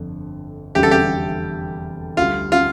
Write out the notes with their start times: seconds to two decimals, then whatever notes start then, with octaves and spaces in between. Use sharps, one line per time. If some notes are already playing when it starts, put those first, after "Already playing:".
Already playing: G1 F2 D3
0.75 F1 E2 D3 G3 G4
0.83 A4
0.91 G4
2.17 D2 D3 G3 F4
2.52 F4